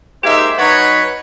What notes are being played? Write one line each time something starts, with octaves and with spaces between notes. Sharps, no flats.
G#3 A#3 D#4 G4 C5 E5
F#3 C#4 D#4 F#4 B4 C#5